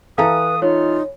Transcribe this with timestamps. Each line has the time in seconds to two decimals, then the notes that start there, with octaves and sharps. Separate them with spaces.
0.18 E3 A4 B4 F5 A#5 D#6
0.62 D#4 F4 C#5